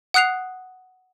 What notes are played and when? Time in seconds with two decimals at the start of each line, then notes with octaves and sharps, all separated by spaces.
0.14 F#5 D#6 F#6 C7 F7